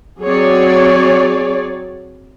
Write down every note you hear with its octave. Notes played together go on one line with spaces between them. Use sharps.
F#3 C4 G#4 C#5 D5